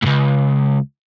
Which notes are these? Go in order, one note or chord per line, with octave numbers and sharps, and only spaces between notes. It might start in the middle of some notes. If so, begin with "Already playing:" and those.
C#2 G#2